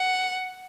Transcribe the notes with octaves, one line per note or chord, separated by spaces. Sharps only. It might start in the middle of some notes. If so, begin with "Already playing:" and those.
Already playing: F#5